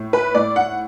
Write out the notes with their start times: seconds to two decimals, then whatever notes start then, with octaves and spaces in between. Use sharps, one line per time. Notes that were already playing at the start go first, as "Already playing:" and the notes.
Already playing: A2
0.13 B4
0.35 A2 D5
0.56 F#5